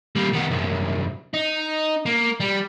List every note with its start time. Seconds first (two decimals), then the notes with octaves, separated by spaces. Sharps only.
0.16 G3 A#3
0.33 D#3 B3
0.51 C2 F#2
1.34 D#4
2.06 A#3
2.40 G3